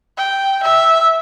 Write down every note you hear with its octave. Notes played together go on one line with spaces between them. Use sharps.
G5
E5